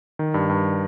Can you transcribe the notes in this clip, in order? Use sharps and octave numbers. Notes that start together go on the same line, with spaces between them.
D#3
G2
G2